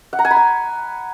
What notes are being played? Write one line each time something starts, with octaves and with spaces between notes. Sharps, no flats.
F#5
A#5
G#5
B5
G#5